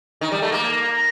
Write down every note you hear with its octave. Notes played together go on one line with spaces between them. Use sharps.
D#3
G3
A3
A#3